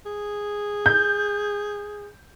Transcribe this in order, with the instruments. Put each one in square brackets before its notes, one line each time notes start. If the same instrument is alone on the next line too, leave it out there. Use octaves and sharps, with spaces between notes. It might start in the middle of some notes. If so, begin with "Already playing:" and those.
[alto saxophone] G#4
[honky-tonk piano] G6